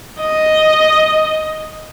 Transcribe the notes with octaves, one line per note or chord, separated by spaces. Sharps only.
D#5